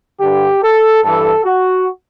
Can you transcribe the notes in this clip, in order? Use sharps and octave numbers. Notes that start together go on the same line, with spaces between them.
G2 D3 G4
A4
G2 E3 A4
F#4